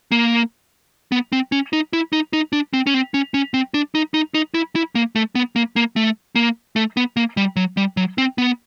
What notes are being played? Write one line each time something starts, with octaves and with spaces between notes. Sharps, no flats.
A#3
B3
C4
C#4
D#4
E4
D#4
D#4
D4
C4
C#4
C4
C#4
C#4
C4
D4
D#4
D#4
D#4
E4
E4
A#3
A3
B3
A#3
A#3
A3
A#3
A3
B3
A#3
G3
F#3
G3
F#3
C4
B3